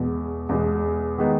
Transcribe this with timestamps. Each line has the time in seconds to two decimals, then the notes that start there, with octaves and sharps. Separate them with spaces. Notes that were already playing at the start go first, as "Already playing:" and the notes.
Already playing: E2 B2 G#3
0.49 E2 B2 G#3
1.18 D#3 G#3 B3 D#4